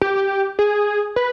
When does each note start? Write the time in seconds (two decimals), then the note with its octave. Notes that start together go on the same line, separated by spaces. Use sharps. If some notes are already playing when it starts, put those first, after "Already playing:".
0.02 G4
0.59 G#4
1.16 B4